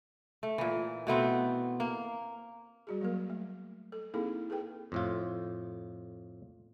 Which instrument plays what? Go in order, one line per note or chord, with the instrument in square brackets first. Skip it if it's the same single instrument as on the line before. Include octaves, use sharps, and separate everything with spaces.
[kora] A3
A#2 E3
B2 A3 B3 C4
A#3
[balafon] G3 F#4 G#4
F#3 A#3 A#4
A3
A4
A#3 C4 D#4 E4 G#4 A4
G#4 A4 B4 G5
[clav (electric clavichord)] F2 A2 F4